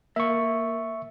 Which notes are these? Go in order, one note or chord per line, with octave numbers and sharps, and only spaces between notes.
A#3 E5 C#6